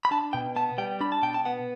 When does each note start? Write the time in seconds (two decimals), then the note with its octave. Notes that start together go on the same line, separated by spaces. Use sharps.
0.05 B5
0.11 D4 A5
0.33 B2 G5
0.56 B3 A5
0.78 G3 G5
1.01 D4 B5
1.12 A5
1.23 B2 G5
1.34 A5
1.45 B3 F#5